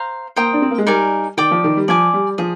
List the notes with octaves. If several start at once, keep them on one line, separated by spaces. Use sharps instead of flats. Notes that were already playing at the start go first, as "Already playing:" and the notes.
Already playing: C5 F5 A#5
A#3 C5 G5 A#5 D#6
D4
C4
A#3
G#3
G3 D#4 A#4 D5 G#5
D#3 D5 G5 D6
F3
D#3
G3
F3 D5 G#5 D6
G3
F3 G#4